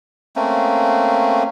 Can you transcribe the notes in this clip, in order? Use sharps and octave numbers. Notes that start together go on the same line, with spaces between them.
A3 A#3 C4 C#4